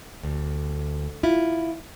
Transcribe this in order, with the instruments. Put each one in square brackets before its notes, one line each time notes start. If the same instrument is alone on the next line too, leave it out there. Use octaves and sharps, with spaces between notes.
[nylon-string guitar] D2
E4 F4